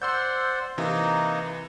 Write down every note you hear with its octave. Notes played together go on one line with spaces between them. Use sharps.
C5 D5 F#5 C6 E6 G6
C3 E3 A#3 D#4